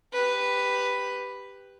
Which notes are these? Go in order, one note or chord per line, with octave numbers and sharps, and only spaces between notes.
G4 B4